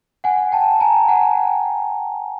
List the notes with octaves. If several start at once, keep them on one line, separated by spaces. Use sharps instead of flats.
F#5 G#5
G5 A5
G#5 A#5
G5
F#5 G#5